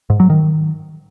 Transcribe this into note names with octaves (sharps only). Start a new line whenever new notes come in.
G#2
F#3
D#3